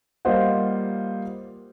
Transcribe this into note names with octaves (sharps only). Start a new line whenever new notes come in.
G3 A#3 F4 C5 D#5 F#5